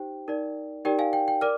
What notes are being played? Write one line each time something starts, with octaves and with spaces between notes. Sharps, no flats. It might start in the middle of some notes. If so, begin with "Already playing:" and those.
Already playing: D#4 G4 C5 G5
D#4 A#4 D5
D#4 G4 A#4 D5 G5
F5 G#5
G5
G5
A#4 D5 D6 F6